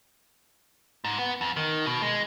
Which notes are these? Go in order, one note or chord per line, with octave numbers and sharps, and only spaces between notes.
G#2
B3
F2
D#3
B2
G#3